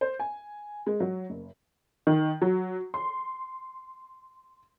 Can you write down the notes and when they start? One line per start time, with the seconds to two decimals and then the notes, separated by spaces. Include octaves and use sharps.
0.01 C5
0.19 G#5
0.86 G#3
1.00 F#3
1.30 F#1
2.07 D#3
2.42 F#3
2.94 C6